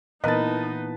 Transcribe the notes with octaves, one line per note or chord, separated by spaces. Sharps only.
A#2 E3 B3 D#4 A#4 B4 D#5 A5